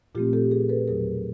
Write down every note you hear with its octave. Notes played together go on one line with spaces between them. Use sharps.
A#2 F3 A3 C4 F4 G4
G4 A4
G#4 A#4
A4 B4
E2 B2 F#3 G#4 A#4